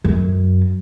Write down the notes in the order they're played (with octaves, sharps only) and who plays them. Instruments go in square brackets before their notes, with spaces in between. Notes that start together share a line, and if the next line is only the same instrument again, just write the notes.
[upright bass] F#2